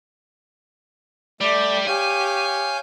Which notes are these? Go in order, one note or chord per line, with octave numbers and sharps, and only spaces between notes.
G3 A3 D5 B5
G4 C#5 F5 G#5 G6